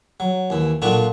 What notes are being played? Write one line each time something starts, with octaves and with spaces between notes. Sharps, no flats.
F#3
D#2 E3
B1 A#2 A3 D4 F4 F#4